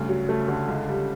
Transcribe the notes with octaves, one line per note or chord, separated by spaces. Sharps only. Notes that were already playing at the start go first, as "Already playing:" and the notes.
Already playing: D2 G2 C#3
F#3
A3
D3
C#2
G3